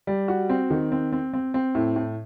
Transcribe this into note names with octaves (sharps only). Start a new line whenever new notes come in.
G3
F#4
C4
D#3
C4
C4
C4
C4
A2
A2